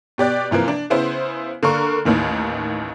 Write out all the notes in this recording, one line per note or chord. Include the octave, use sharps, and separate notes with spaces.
B2 G4 D5 F#6
C3 E3 F3 A#3
D4
C#3 B3 E4 C5
D3 A#3 D4 A#4 C#6
A1 D#2 D#3 E3